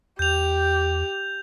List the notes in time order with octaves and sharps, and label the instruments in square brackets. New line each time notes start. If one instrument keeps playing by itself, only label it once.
[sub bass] E2 [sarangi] G4 [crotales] G6 F7